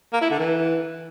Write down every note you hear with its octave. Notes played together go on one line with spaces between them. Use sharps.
A#3
E4
D3
E3